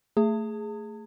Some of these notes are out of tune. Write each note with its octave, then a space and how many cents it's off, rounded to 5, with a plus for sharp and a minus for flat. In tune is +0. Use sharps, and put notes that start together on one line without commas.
A3 +15 G#4 +0 A5 +45